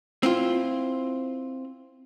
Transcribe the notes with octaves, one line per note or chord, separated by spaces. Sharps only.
C4 E4 F4